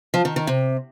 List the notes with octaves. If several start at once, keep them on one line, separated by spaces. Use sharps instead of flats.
F3
D#3
D#3
C3